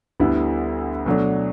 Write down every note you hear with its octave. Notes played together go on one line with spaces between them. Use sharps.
D2 D3 G3 B3 E4
B2 F#3 A3 D4